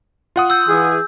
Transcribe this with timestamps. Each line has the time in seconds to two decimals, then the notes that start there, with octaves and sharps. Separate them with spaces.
0.36 F4 F#5 D#6
0.50 E6 G6
0.69 E3 G#4